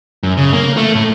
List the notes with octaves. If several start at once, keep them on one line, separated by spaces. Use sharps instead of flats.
F#2
C#3
A#3
A3
A2